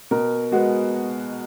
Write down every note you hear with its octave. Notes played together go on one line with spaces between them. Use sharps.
B2 A#4
G#3 B3 F#4